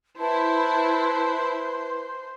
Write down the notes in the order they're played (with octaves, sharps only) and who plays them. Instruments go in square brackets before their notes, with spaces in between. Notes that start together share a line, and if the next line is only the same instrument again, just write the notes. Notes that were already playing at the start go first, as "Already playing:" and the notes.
[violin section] E4 [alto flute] B4 [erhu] C5 [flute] A5